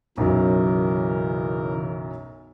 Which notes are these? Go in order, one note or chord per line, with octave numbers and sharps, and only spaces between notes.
B1 F#2 C#3 E3 F#3 A#4